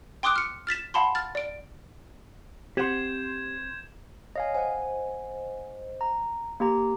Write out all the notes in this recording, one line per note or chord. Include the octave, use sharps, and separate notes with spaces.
G5 C6 D6 D#6 F#6 D7
F6 C#7
F6 A6 B6 E7
F5 F#5 A5 B5 C6
F6 A6
D5 D7
C4 G4 F#5 C6 G6 G#6 E7
C#5 D#5 F5 G#5
C5 D#5 F#5 G#5
A#5
A#3 G4 A#5